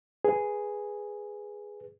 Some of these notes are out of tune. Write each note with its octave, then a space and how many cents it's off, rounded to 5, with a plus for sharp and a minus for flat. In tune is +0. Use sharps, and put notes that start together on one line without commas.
G#4 +0 B4 +0